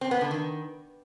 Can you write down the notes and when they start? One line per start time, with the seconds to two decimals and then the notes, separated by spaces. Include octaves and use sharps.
0.01 C4
0.11 B3
0.21 D3
0.31 D#3